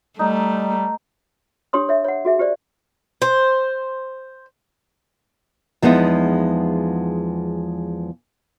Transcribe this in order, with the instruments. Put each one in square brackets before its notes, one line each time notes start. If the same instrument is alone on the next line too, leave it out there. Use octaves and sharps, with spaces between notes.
[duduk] G3 [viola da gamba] A3 [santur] D#4
[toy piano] D4 G4 C#5 C6 D#6
C#5 E5
C#5 F#5
F#4 G#4 E5
G4 C5 D5
[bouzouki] C5
[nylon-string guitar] E2 F3 G#3 B3 D#4 E4